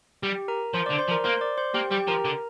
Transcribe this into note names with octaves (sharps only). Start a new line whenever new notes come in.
G3 G4 G5
A#4 A#5
F3 C5 C6
D3 D5 D6
C5 C6
F3
A#4 A#5
A#3 C5 C6
D5 D6
C5 C6
A#3 G4 G5
G3 G4 G5
F3 A#4 A#5
D3